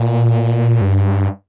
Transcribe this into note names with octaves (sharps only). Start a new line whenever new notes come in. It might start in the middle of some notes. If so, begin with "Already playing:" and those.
Already playing: A#2
G2